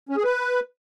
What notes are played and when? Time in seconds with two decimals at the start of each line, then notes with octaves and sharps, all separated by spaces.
0.09 C#4
0.16 G#4
0.24 B4